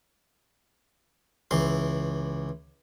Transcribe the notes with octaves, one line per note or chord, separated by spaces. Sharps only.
C#2 E3 C6